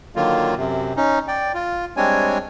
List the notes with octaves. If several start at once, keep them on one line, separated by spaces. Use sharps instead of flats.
D3 D#3 F#3 A#3 F4
F#2 C3
C#4 D#4
D5 G5
F4
G3 G#3 C4 D4 C#5 G#5